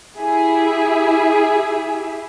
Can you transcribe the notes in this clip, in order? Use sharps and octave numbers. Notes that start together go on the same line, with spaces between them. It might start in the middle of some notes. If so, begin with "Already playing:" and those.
E4 G4 G#4 E5